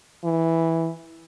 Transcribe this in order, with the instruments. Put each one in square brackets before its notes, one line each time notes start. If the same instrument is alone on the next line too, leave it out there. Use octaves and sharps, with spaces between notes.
[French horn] E3